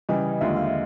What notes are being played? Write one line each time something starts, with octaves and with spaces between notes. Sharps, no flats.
C#3 E3 G3 D#5
D#2 D3 F3 G#3 E5
F5